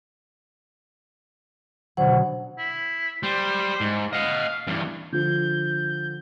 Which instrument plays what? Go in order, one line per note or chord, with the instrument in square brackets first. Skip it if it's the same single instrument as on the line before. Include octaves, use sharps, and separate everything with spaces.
[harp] B2 D3 F#3 [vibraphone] C5 F#5
[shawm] E4
[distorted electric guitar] G3 [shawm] C5
[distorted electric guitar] G#2
[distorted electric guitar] D#5 F#5 [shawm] F5
[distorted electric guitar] E2 G2
[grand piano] D3 F3 [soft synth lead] G6